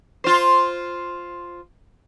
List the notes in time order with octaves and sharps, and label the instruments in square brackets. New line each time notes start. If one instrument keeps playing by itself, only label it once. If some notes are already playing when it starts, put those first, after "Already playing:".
[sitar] F4 C5